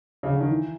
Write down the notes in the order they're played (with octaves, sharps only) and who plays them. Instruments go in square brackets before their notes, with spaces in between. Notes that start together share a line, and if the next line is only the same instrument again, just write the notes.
[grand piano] C#3
D3
D#3
E3